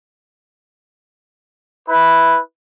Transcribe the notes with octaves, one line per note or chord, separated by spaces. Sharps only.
E4 B4